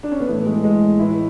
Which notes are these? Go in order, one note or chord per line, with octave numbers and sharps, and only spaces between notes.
D4
C#4
B3
A2 E3 A3
G#3
G#3
A2 E3 E4